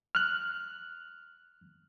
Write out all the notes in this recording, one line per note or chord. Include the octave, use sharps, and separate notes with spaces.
F6 F#6